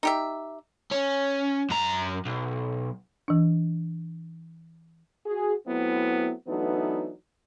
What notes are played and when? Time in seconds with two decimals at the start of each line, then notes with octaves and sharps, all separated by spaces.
0.03 D#4 G4 E5
0.92 C#4
1.71 F#2 A#5
2.25 B1
3.28 E3 D4
5.26 F#4 G#4
5.67 F#3 A3 B3 C4 E4
6.48 E3 F#3 A3 B3 D4 D#4